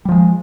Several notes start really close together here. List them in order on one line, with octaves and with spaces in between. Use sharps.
G3 F3 G#3